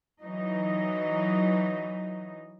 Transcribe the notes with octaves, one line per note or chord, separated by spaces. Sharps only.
E3 F#3 D#4